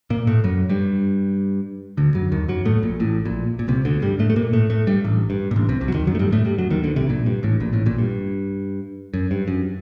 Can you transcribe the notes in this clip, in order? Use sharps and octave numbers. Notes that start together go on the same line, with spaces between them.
A#2 A#3
A2 A3
F#2 F#3
G2 G3
D2 D3
F#2 F#3
D#2 D#3
F#2 F#3
A2 A3
A#1 A#2
A1 A2
A#1 A#2
A#2
C2 C3
D2 D3
G2 G3
A2 A3
A3
A#2 A#3
A2 A3
A2 A3
G2 G3
A1 A2
G2
A#2
A1 A2
C2 C3
C2 C3
F#3
D#2 D#3
F#2 F#3
A3
G2 G3
A2 A3
G2 G3
F#2 F#3
D#2 D#3
D2 D3
C2 C3
A#1 A#2
G2
A1 A2
A#1 A#2
A1 A2
A#1 A#2
G2
F#2
G2
F#2